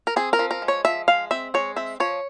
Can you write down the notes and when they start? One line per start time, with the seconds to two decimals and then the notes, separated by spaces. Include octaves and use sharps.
0.07 A#4
0.16 C4 G#4
0.33 A#4
0.39 F3
0.51 A#4
0.62 G#3
0.68 C#5
0.85 F3 E5
1.08 G#3 F5
1.31 C4 E5
1.54 G#3 C#5
1.76 C4 E5
2.00 F3 C#5